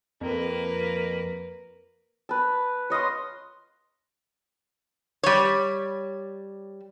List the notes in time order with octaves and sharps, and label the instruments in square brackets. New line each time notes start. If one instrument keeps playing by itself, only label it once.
[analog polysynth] F2 [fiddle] A#3 B4
[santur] B4 A5
C#5 D#5 F5 C6
[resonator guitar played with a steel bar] G3 C#5